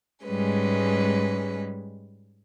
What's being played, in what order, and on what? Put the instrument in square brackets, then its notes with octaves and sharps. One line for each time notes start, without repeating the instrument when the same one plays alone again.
[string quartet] G#2 G3 G#3 C#4 B4